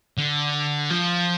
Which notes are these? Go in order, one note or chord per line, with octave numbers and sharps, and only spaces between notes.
D3
F3